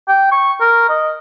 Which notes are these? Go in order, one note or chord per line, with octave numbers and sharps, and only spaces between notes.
G5
C#6
A#4
D#5